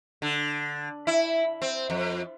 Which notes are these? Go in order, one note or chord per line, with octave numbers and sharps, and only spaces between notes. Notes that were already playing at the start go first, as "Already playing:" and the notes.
D3
E4
C4
F2